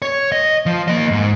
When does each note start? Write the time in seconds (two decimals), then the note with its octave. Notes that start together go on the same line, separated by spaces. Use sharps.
0.02 C#5
0.32 D#5
0.66 F3
0.88 A#3 D#5
1.11 G#2